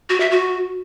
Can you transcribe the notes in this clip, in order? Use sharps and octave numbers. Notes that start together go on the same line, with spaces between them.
F#4
E5
F#4